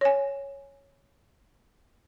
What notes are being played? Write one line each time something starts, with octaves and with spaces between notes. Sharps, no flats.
C#5 G#5